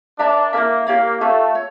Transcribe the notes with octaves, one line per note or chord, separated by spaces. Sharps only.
D4 A#4 C#5 E5 A#5
A#3 E4 A#4 E5
A#3 E4 G4 C#5 F5
A3 F4 C#5 E5 A5
C#5